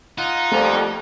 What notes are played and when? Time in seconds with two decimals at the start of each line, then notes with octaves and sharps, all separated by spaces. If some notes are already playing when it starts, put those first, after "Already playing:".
0.18 D#4 F4 F#5
0.51 F2 G3 A3 A#3 C5 F7